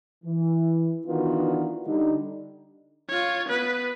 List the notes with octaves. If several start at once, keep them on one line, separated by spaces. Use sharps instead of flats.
E3
D#3 E3 B3 D4 F4 F#4
D3 G3 D#4
F4 C#5
B3 B4